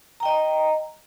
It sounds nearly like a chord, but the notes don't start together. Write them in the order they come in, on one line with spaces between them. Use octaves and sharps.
A#5 G5 D#5